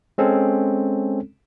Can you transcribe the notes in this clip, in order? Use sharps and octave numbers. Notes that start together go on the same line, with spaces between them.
G#3 C4 C#4 A4